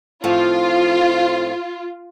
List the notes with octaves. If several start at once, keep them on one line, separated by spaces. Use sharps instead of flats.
A2 F3 C4 F4